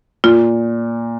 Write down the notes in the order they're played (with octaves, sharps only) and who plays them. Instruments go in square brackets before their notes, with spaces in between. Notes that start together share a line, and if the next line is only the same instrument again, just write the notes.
[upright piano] A#2 [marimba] F4